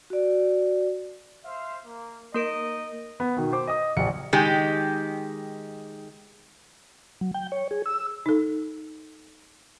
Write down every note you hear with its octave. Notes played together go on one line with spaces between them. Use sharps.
F#4 D5
C5 E5 F5
A#3
A#3 D#4 A#4 D#5 D7
B3
B2 D#3
C5 D6
D#5 D#6
A#1 G4 D5 F#5 C#7
D#3 G#3 G4
F#3
G5
C#5
G#4
E6
D#4 A4